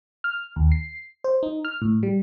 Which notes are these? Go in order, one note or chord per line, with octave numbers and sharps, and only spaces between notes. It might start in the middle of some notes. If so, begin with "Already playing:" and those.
F6
D#2
C7
C5
D#4
F6
A2
G3